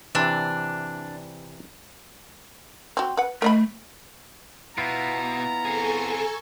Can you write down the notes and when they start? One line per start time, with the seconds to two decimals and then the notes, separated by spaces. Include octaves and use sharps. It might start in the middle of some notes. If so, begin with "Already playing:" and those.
0.15 C3 E3 D4
2.97 C4 F#4
3.17 B4 F#5
3.42 A3 A#4 D#5 B5
4.78 B2 B3 E4 F4 A#5
5.65 C4 G#4 A4 G#5 C#6